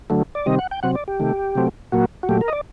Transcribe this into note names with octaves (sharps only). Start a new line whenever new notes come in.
D3 F#3 A3
D5
C3 D#3 G3 C4 D#5
F#5
G5
C3 F#3 C4 F#5
D5
G4
C3 D#3 A3
C3 F#3 A3 C4
A#2 F#3 A#3 F#4
F#4
A#2 F#3 A3 G4
A#4
D#5
D5